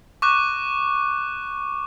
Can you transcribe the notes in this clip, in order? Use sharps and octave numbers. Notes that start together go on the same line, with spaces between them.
C#6 D6 F#6